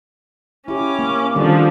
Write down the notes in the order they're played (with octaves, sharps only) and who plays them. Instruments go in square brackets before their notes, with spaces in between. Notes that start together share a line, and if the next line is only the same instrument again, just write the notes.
[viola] C#4 D6 [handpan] E4 G4
[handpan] A#3
[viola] D3 F3 [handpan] D#3 G3 C#4